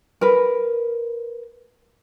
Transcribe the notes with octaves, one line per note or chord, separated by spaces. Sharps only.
A#4 B4